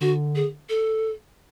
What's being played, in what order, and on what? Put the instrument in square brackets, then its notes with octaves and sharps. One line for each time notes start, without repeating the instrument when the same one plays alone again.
[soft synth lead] D3 [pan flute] F#4
[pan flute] G#4
A4